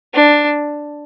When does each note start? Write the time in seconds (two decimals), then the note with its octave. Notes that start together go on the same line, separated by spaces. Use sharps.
0.14 D4